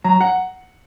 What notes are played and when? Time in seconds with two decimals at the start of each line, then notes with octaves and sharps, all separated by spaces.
0.04 F#3 A#5
0.21 F#5